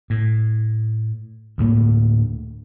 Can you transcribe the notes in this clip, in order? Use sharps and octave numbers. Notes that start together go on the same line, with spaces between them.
A2
D2 A2 A#3